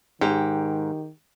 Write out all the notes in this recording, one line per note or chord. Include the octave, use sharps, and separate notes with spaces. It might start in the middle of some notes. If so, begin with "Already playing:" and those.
G#2 D#3 G4 G5